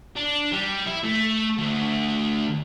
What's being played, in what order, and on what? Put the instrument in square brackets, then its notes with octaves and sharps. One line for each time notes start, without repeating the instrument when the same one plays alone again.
[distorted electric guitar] D4
G3
E4
A3
D2